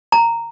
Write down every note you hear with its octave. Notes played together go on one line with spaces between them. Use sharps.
A#5